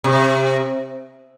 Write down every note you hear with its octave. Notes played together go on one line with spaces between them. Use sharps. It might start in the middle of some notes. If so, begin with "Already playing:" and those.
C3